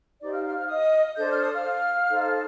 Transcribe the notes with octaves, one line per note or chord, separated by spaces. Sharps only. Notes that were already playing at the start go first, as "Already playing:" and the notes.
D#4 G4 C5 D5 D6
F5 F6
F5 F6
F5 F6
D#5 D#6
D4 A4 C5 G6
F6
D#6
F5 F6
D#4 A4 C5